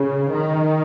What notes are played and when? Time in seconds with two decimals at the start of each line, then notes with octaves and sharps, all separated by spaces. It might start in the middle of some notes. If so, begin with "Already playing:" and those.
Already playing: C#3
0.32 D#3